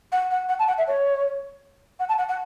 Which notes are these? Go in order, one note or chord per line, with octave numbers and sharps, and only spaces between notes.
F#5
F#5
F#5
A5
F#5
E5
C#5
F#5
A5
F#5
F#5